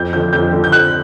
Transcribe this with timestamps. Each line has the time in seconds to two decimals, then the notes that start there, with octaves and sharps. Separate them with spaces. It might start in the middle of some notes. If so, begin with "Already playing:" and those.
Already playing: F2 G6
0.13 D3 F3 G6
0.33 F2 G6
0.52 D3 F3
0.64 G6
0.72 F2 F#6